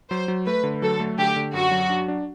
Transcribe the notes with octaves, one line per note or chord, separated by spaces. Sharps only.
F#3 C5
F#3
A3 B4
D3
F#3 A4
A3
D3 G4
D3
F#2 F#4
F#3
D4
D4